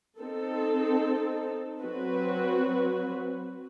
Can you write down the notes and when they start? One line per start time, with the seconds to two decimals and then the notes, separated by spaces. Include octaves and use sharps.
0.20 C4 D#4 A4
1.81 F#3 C4 F#4 B4